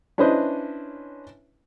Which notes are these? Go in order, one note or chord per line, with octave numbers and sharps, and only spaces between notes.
C#4 D4 E4 B4 C5 D#5